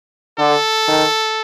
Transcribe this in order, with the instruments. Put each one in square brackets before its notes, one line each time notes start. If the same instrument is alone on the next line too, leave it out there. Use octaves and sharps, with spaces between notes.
[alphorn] D3 [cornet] A4
[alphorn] D#3